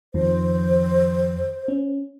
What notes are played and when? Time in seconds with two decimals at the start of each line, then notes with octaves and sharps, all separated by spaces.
0.14 F2 D#3 F3 C5
1.68 C#4